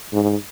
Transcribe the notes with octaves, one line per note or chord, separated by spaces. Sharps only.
G#2